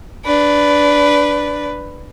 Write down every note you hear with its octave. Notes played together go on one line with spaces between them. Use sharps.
D4 B4